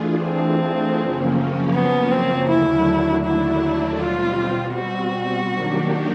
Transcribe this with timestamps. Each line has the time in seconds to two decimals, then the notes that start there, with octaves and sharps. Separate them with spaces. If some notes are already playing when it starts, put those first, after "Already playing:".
Already playing: E3 A3 D4 F4 G#4
0.24 C4
0.99 F#2 C#3 F3 A#3 C#4
1.74 B3
2.11 C4
2.49 D#2 D3 F#3 A3 D4 E4
3.24 E4
4.00 B2 G3 C4 F4
4.74 F#4
5.50 D#3 F#3 A#3 D4 G4